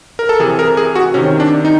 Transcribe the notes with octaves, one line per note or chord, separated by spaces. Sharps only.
A#4
A4
C3 E3 G#4
A#4
G#4
F#4
C3 D#3 C#4
D4
D#4